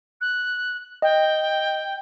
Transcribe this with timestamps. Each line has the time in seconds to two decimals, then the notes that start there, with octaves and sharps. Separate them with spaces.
0.21 F#6
1.02 D#5 G5